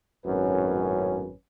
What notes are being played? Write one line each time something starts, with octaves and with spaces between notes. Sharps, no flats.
G#1 F#2 A2 C#4 B4